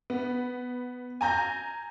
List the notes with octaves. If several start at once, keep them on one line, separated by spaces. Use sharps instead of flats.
B3
G#5 A#5 G6 A#6